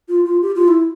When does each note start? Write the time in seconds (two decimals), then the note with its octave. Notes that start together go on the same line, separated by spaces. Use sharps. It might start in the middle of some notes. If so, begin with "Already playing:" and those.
0.09 F4
0.25 F4
0.42 G4
0.56 F4
0.68 E4